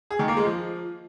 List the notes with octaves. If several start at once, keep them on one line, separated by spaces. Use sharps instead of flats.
G#4
D#3
A#3
G#3
F3